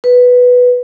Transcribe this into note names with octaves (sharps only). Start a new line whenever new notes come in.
B4